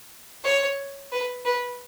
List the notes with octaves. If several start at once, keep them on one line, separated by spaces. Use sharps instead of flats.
C#5
B4
B4